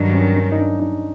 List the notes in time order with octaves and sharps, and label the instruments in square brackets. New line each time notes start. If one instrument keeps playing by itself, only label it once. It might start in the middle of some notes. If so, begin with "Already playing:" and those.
Already playing: [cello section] G2 D#3 F#3 [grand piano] D4
[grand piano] C#4
C#4
D#4
D4
D#4